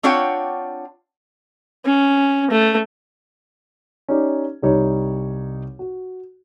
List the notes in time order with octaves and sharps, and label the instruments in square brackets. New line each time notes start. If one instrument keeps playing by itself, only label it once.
[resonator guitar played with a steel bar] C4 D4 F4 C#5 F#5 G5
[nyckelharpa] C#4
A3
[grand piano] C#4 D#4 G4 D5
C2 G3 D#4 C#5
F#4